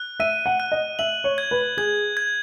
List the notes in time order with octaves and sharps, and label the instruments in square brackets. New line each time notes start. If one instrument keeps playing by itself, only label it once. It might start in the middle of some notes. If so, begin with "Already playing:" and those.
Already playing: [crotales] F#6
[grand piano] E5 [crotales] D#7
[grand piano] F#5
[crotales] F#6
[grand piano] D#5
[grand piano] E5 [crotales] F#7
[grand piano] C#5
[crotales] G#6
[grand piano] B4
[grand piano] G#4 [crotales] G#6
[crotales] G#6